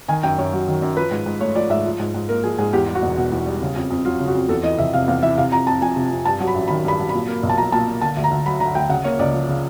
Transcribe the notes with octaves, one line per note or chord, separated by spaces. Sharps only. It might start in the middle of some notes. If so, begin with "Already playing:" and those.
D#3 G#5
F#2 G5
F#2 C#5
F#3
D#3
F#2
F3 B4
G#2
G#2
A3 C#5
F3 D5
G#2 E5
F3
G#2
G#2
A#3 A#4
F3 G#4
G#2 G#4
E2 G4
G3
F#4
E1
B2
E2
G3
C#3
F2
F2
F#3 F4
C#3
F#4
F2
E2 A4
E3 D#5
F1 E5
C3 F5
E2 F5
E3 E5
C3 F5
F2 A#5
F2 A5
F3 G#5
C3
F2
G2 A5
F#3
B5
A1
D#3 B5
G2 B5
F#3
A#2 B5
A#3
B1
A5
F3 A#5
A#2 A5
A#3
D3 A5
D2
A#5
D2
F#3 B5
D3 A#5
D2 G5
C#3 F#5
A#3 C#5
C#2 D5
F3
C#3